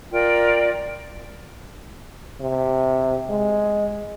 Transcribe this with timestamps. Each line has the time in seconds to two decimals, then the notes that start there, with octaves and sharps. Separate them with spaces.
0.12 F4 A#4 D5 G5
2.41 C3
3.30 G#3